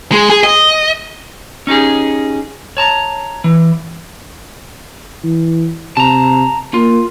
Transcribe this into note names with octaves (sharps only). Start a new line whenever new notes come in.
G#3
G#4
D#5
C#4 D#4 G4 G#4
C#5 A5 A#5
E3
E3
C3 A5 A#5
A#3 F4